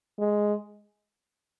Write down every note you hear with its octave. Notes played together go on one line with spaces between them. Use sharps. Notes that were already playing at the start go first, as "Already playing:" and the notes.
G#3